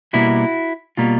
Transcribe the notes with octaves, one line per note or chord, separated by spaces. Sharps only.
B2 G3 A#3 E4 F#4
B2 G3 A#3 F4